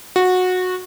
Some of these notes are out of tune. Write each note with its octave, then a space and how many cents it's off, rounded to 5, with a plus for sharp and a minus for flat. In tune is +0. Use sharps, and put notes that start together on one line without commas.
F#4 -15